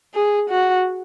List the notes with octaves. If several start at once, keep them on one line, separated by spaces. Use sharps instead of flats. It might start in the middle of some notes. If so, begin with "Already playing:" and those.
G#4
F#4